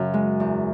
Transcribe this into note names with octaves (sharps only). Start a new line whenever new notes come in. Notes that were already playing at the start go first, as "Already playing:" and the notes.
Already playing: F#2 C#3
G#3
E2